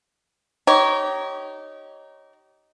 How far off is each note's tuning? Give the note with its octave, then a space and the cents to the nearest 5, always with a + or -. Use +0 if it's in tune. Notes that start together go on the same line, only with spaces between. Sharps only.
D#4 +0 G4 -30 C#5 +0